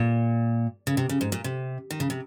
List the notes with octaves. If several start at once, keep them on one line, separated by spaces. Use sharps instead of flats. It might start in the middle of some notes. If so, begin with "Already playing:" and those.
Already playing: A#2
C#3
C3
C#3
G#2
A#2
C3
D#3
C#3
C3